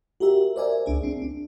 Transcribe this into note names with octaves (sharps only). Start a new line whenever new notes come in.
F#4 G4 A#4 E5
A#4 C5 D5 E5 G#5
C#2 D4 G#4
C4 D4
D4